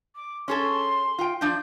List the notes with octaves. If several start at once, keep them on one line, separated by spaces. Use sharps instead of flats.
D6
C#4 G#4 A4 C6
F4 G5
F3 D4 F4 G6